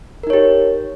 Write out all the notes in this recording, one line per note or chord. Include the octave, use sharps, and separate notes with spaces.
D#4 G4 A#4 C#5